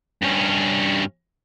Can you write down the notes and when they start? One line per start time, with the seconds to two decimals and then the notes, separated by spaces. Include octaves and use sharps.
0.22 G2 C#4